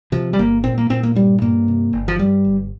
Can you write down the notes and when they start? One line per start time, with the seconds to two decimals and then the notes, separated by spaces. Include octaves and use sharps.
0.12 C3 F3
0.33 G3
0.38 G1 A#3
0.64 A#2 C4
0.78 A#3
0.89 A#2 C4
1.03 A#3
1.15 G2 G3
1.42 G2 A#3
1.68 C3
1.93 G1
2.08 F3
2.19 G2 G3
2.45 G1